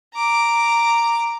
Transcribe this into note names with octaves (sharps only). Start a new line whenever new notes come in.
A#5 D6